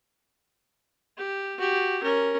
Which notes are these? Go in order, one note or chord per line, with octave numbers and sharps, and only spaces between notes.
G4
F#4 G4
C#4 A#4